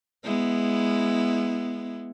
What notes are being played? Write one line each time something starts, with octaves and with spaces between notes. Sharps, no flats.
G#3 B3 E4